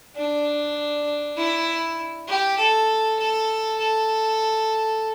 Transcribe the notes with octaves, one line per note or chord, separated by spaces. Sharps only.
D4
E4
G4
A4
A4
A4